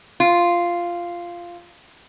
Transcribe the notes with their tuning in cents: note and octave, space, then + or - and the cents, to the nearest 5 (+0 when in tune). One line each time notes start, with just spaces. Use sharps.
F4 -5